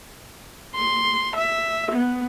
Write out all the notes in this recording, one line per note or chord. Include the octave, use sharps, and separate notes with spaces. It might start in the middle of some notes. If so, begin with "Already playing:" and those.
C6
E5
B3